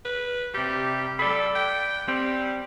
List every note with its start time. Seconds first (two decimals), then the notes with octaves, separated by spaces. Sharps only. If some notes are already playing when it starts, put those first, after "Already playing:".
0.05 B4
0.55 C3 G3 G4
1.19 A4 D5 B5
1.56 G5
2.08 G3 C4 G5